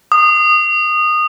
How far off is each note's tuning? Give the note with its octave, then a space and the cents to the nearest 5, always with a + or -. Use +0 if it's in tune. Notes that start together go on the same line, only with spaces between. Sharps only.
D#6 -20